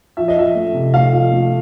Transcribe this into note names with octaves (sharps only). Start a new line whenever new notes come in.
F3 E5
D#5
F3 E5
A3
C3
A3 F5
F3
A3